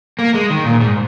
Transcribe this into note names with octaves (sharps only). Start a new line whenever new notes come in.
A#3
G#3
D#3
A#2
G#2